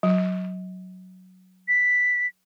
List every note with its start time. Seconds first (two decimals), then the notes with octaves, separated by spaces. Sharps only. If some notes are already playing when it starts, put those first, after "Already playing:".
0.03 F#3
1.68 B6